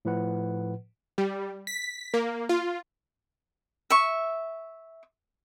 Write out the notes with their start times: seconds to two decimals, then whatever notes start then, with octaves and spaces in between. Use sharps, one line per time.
0.05 A2 F3 B4 F#5
1.18 G3
1.67 B6
2.14 A#3
2.49 F4
3.90 E5 C#6